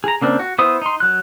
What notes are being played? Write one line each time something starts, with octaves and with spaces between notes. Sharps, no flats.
G#4 A#5
C#3 A#3 C4 D4
F#4
B3 E4 C5 D#6
D#4 C6
F#3 F#6